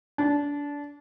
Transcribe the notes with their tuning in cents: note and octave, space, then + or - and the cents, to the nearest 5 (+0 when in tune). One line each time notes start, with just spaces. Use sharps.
D4 -25